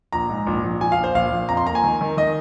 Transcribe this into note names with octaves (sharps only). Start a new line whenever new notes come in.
A#1 A#5
G#2
A#1
A#1
F3 G#5
F5
A#1
C5
A#1 F5
A#1
F2 A#5
C6
A#3 A#5
G#5
D#3
D#3
D#3 D#5